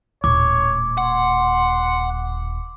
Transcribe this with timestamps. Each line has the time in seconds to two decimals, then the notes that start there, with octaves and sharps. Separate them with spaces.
0.24 D#1 A2 C#5 D6
0.98 F#5 C6